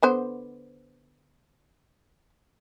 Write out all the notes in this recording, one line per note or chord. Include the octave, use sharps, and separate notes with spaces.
D3 B3 C5